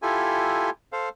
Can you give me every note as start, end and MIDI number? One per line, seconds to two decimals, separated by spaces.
0.02 0.70 64
0.02 0.70 65
0.02 0.70 67
0.02 0.70 69
0.02 0.70 80
0.92 1.09 69
0.92 1.09 72
0.92 1.09 77